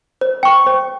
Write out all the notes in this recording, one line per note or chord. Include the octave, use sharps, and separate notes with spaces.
C5
G5 C#6
C5